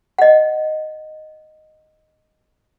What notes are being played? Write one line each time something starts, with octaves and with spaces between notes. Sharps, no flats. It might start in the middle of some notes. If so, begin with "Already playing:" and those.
D#5 F#5